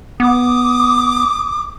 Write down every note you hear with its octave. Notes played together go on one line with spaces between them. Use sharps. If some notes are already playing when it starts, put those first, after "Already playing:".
B3 D6 D#6